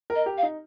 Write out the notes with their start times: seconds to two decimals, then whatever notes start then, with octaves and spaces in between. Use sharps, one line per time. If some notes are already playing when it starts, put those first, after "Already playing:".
0.10 A#4
0.15 D#5
0.26 G4
0.37 F5
0.43 D#4